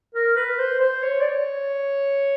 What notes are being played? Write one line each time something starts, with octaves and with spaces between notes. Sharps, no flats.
A#4
B4
C5
C5
C#5
D5
C#5